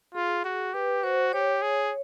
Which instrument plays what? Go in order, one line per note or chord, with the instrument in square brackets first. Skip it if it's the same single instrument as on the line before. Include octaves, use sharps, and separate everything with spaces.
[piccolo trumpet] F4 [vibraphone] G#4
[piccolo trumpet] F#4
[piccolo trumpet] G4 [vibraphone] B4
[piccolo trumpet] F#4 [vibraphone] C5
[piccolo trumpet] G4 [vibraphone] C#5
[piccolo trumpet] G#4